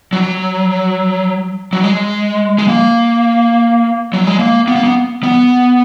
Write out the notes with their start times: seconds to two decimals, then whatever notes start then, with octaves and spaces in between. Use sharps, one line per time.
0.13 F#3
1.73 F#3
1.83 G#3
2.58 G#3
2.68 A#3
4.13 F#3
4.26 G#3
4.39 A#3
4.68 B3
4.76 A#3
4.84 B3
5.23 B3